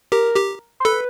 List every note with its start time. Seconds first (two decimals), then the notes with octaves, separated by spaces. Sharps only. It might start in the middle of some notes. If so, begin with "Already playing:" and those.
0.12 G4 A#4
0.36 G4
0.80 C5
0.85 A4 B4